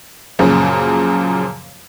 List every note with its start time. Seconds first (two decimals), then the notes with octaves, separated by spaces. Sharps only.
0.39 F#2 A#2 C#3 F3